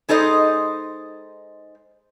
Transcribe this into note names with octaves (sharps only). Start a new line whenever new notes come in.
G#3 D#4 A4 C5 D#5